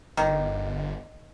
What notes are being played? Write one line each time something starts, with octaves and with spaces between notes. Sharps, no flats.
G1 D#3